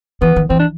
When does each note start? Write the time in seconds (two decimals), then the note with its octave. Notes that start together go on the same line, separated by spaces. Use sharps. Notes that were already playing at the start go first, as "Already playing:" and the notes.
0.21 E3 B3
0.36 D#3
0.50 E3 C4
0.59 D4